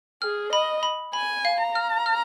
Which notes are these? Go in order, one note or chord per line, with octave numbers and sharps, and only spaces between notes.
G#4 F6
D#5 B5
B5
G#5 B5
F5
A#5
F6
F6